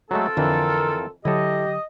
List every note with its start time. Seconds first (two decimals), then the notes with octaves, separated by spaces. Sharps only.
0.11 F#3 G#3 A3 C4 F4 A4
0.37 F2 D3 E3 A#4
1.25 D3 F#3 E4 G4 A4 D#5